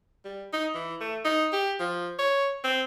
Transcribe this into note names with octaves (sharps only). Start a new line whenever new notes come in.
G3
D#4
E3
A3
D#4
G4
F3
C#5
C4